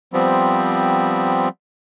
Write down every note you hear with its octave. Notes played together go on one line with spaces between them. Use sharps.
F3 G3 B3 C4